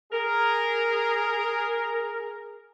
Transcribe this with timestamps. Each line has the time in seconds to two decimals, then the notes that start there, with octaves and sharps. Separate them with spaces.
0.11 G#4 A#4